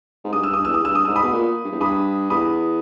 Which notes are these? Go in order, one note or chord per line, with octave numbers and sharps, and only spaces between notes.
G#2
G2 D#6
E6
G2 D#6
E2 E6
D#6
G2 E6
D#6
G#2 E6
B5 D#6
B2
A#2
G2
E2
G2 B5 D#6
E2 B5 D#6